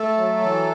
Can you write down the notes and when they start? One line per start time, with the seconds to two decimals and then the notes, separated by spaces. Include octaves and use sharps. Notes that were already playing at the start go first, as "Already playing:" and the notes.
Already playing: A3 A4
0.17 F#3
0.42 E3